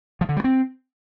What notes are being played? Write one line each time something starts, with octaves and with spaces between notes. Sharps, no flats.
F3
D3
G3
C4